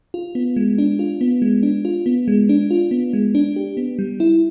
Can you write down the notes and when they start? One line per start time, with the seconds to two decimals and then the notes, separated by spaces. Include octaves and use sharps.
0.14 F4
0.35 B3
0.56 G#3
0.78 D4
0.99 F4
1.21 B3
1.42 G#3
1.63 D4
1.85 F4
2.06 B3
2.28 G#3
2.49 D4
2.71 F4
2.91 B3
3.13 G#3
3.35 D4
3.56 G4
3.77 B3
3.99 G3
4.20 E4